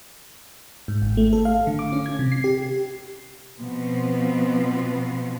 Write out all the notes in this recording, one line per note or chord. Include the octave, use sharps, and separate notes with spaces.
G#2
G#1
A3
A4
F5
D3
D6
C#4
G#6
C3
C7
G4
B2 F3 B3 C4